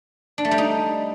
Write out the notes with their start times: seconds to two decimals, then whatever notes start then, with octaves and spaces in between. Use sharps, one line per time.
0.38 D4
0.45 A3
0.51 G3
0.58 D#4